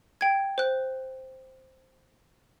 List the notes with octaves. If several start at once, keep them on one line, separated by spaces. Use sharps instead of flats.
G5 G#6
C5 F#6